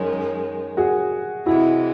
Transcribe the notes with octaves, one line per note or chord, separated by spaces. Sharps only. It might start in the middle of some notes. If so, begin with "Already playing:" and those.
Already playing: F#2 D#3 G#3 C#4
F#4 G#4
C3 E3 G#3 E4 F#4